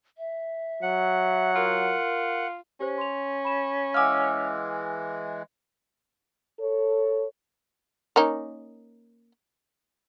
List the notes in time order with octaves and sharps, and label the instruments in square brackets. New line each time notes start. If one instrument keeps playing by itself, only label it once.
[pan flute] E5
[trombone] F#3 [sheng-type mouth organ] F#5
[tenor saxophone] F4 [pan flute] A#4
[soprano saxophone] C#4 [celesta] G4 C5
[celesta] C6 F7
B5 E7
[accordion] E3 G#3 [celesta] F5 F#5 G#5 [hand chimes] D6 E6 F6
[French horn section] A4 C#5
[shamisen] A#3 C#4 D#4